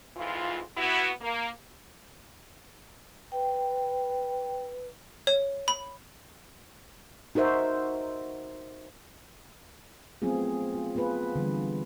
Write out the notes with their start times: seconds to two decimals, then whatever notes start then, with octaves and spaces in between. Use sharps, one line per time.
0.17 F2 G#2 E3 F4
0.77 B3 E4 F#4
1.21 A#3
3.32 B4 G5
5.27 C#5
5.68 B5
7.35 D#4 F#4 A#4 C5 E5
10.22 F#3 A3 B3 C4 F4 G#4
10.75 F4
10.95 B3 F4 G#4 B4
11.35 D3 E3 G3